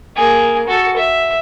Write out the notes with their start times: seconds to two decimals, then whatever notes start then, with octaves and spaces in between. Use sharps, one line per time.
0.16 A#3 G#4
0.68 F#4 A4
0.96 E5